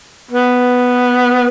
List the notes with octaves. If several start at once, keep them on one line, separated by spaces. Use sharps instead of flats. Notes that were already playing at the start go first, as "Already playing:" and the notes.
B3